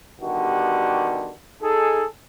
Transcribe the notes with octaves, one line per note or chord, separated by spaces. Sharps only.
B2 D3 D#3 G3 F#4 G4
D#4 G#4 A4